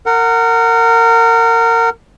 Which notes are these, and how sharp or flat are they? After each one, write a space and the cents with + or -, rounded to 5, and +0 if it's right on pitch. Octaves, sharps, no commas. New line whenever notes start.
A#4 -25 F#5 +0